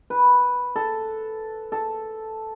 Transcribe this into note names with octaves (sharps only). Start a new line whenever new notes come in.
B4
A4
A4